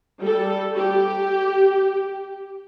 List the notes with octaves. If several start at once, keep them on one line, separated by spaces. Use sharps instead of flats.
G3 A4
G4